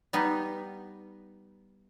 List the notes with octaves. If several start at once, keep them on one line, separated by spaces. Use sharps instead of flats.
G3 B3 D#4